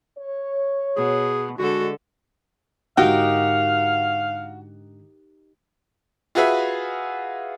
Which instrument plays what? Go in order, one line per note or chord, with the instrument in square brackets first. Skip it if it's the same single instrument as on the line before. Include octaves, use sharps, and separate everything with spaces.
[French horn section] C#5
[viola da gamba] B2 [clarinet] G#4
[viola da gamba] D3 A4 [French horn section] G#3 [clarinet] F#4
[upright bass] G#2 D3 [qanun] D#4 G4 A#4 [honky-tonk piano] F#4 [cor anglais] F5
[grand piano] F4 F#4 G#4 B4 E5